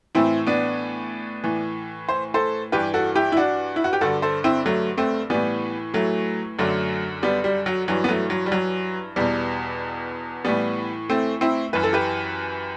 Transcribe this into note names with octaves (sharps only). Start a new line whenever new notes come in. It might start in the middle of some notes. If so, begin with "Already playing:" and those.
A2 E3 C4 E4
B3 D4
A2 E3
C5
A4 C5
G2 E3 G4 B4
F#4 A4
E4 G4
E4
D4 F#4
E4
F#4
G4
G2 D3 F#4 A4
A4 C5
C4 E4
F#3 A3
A3 C4
A2 E3 G3 B3
F#3 A3
F#2 D3 F#3 A3
G3 B3
G3
F#3
G2 E3 F#3
B3
F#3 A3
F#3
G3
F#3
E2 B2 G3
A2 E3 G3 B3
A3 C4
C4 E4
F#2 E3 B4
A4
G4 B4